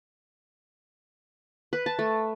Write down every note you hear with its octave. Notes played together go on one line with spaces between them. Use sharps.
B4
A5
A3